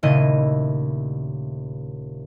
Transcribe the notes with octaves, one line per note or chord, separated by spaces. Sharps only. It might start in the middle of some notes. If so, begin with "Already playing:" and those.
D#1 C#3 A3 E4 D#5 D#7